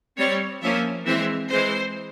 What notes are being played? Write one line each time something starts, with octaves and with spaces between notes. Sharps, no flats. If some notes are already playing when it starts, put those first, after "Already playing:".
G3 C4 C#5
F3 A#3 C#4 E5
E3 G#3 C4 E5
E3 G#3 C4 C5